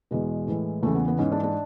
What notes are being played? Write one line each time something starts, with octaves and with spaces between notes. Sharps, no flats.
E2 B2 G#3
A2 E3
E2 C#3 E3 A3
B3
B3
G#2 E3 C#4
D4
D4